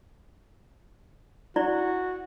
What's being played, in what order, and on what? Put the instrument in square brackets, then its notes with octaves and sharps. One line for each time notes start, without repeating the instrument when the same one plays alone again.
[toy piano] E4 D5 [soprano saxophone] F#4